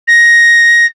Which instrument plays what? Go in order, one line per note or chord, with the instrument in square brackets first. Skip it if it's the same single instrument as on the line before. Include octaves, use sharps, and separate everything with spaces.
[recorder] A#6